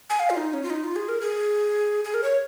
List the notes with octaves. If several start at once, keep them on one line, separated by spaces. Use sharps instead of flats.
G#5
F5
F4
D#4
C#4
F4
D#4
F4
G#4
A#4
G#4
G#4
A#4
C#5